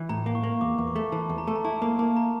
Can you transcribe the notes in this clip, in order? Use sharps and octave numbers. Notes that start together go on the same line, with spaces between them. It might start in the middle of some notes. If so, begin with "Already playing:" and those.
Already playing: E3
A2 A#5
A#3
C#6
A#3
E2 D6
E2
C#6
A3
E3 A5
E2
A#5
A3 A5
A#5
E4 A5
A#3 A#5
A#3 A5
A#5